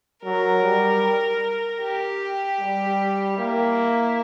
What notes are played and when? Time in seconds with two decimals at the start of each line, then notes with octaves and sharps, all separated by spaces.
0.24 F#3 A#4
0.63 G3
1.81 G4
2.60 G3
3.38 A#3 E4